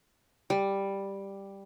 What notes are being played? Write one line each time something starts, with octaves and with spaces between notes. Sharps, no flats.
G3